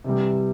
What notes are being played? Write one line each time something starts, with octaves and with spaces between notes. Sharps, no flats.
C3 E3 G3